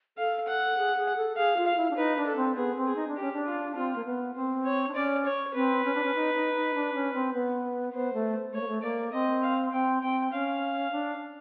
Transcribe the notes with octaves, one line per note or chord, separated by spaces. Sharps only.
A4 F5
F#5
G#4
G#4
A4
G#4 F5
F4
F5
E4
D4
D#4 B4
D4
A4
C4
B3 G#4
C4
G#4
D#4
D4
C#4 G4
D4
F4
C4 F4
A#3
B3
C4 C5
C#5
D4
C#4 D5
C#5
C4 B4
C#4
D4
C#4
D#4
D#4
D#4
D4
C#4
C4
B3
B3 C5
A3
A3 C#5
A#3
A3
A#3 D5
C4 D#5
F5
C4 G5
C4 G5
C#4 F5
D4